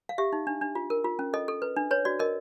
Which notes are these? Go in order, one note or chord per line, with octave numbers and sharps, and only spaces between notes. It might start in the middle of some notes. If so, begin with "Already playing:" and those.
F5
G4 E5
D#4
D4
D4
F4
A#4
F4
C#4
A4 D#5
A4
B4
D4
B4 C#5
F#4 D5
A#4 D#5